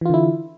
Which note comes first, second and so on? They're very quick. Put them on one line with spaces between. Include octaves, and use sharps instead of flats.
E3 F4 D3 E4